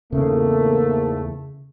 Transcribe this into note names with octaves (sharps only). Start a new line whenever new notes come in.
E2 G#2 C#3 A3 A#3